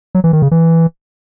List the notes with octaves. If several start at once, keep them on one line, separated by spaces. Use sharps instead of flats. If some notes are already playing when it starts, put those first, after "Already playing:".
F#3
E3
D#3
C#3
E3